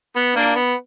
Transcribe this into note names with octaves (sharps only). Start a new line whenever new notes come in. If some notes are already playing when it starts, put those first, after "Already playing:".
B3
A#3 D4
B3